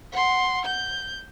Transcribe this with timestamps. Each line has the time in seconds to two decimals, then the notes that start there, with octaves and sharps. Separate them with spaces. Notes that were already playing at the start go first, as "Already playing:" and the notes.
0.12 F#5 C6
0.65 G6